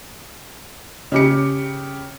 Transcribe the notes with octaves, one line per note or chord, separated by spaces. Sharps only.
C#3 G4 C#7